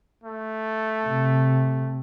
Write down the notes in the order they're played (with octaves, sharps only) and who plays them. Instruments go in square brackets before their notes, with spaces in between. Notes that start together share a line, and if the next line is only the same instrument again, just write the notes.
[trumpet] A3
[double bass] C3